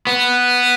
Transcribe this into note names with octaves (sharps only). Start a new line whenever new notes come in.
B3